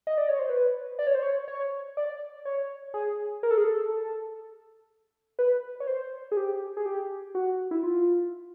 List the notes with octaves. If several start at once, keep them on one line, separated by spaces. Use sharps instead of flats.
D#5
D5
C#5
C5
B4
D5
C#5
C5
C#5
C#5
D5
C#5
G#4
A#4
A4
G#4
A4
B4
C#5
C5
G#4
G4
G#4
G4
F#4
E4
F4